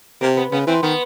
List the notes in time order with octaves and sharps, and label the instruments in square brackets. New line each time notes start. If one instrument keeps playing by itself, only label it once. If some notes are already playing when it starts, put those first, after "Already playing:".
[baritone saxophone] C3 [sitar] A#3
[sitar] B3
[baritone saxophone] C#3 [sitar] B3
[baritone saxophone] E3 [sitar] C4
[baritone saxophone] D#3 [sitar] B3